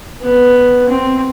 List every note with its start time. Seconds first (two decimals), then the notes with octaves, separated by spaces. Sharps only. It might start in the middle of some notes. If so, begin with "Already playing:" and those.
0.22 B3
0.89 C4